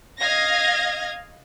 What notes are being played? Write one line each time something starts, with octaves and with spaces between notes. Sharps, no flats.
D#5 F5 G#6 A#6